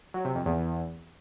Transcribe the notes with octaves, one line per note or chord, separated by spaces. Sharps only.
F#3
C3
F2
E2